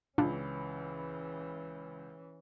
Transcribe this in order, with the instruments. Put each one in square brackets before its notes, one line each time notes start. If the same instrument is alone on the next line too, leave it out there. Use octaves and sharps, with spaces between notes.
[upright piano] C#2 [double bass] E3 C#4 [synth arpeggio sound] D4 F4